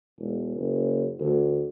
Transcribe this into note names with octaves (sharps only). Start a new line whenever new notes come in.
E1
F#1
D2